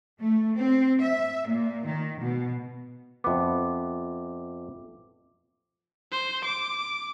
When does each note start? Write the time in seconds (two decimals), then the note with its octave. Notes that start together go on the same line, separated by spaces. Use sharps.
0.20 A3
0.56 C4
1.01 E5
1.48 A#2
1.86 D#3
2.19 B2
3.24 F2 B3 E5 D6
6.12 C5
6.45 D6